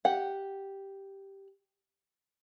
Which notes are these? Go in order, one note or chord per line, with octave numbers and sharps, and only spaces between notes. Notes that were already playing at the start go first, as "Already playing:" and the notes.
G4 F#5